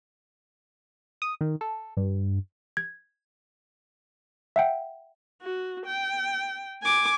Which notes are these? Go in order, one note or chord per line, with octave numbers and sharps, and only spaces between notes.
D#6
D#3
A4
G2
G#6
E5 F#5 G5
F#4
G5
G#5 D6